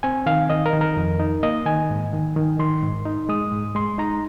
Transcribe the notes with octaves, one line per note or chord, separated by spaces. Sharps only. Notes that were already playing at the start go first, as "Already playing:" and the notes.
C4 G#5
D#3 F5
D#3 D#5
A#4
D#3
A#4
F2
D#4
A#3 D#5
D#3 G#5
G#2
D#3
D#3
D#3 C6
G#2
D#4
G#3 D#6
G#2
G#3 C6
D#4 A#5